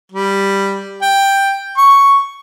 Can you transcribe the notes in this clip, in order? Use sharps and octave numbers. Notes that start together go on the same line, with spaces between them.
G3
G5
C#6